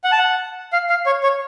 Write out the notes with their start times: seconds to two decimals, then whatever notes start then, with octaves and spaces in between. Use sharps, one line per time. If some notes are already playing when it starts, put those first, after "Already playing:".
0.04 F#5
0.12 A5
0.19 F#5
0.73 F5
0.89 F5
1.06 C#5
1.23 C#5